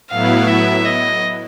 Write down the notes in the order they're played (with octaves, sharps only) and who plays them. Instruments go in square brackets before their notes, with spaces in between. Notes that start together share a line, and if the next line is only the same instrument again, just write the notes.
[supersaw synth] A2 F#3 B3 E4 [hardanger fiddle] F5
[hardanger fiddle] E5
D#5